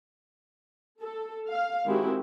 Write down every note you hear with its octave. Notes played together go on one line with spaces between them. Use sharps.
A4
F5
D#3 G#3 C4 E4 F#4 G4